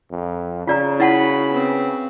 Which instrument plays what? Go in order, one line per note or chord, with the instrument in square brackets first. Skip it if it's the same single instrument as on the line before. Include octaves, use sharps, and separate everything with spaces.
[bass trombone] F2
[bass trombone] C#3 [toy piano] F4 D5 A#5
[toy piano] E4 F#5 A5 [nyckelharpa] F#4 B5
[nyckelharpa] B3 C4